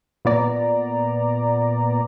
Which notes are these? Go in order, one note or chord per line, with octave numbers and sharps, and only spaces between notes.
A#2 B3 D5 A#5